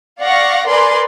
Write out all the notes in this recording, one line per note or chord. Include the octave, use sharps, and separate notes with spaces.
D5 F5 F#5 C#6 A#6
A#4 B4 D5 G#5 C6